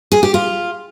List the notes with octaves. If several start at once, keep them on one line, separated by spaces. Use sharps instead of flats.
G#4
G4
F4